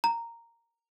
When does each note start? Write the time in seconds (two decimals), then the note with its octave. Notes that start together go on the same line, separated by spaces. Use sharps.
0.04 A#5